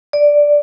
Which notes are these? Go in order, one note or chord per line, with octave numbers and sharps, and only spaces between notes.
D5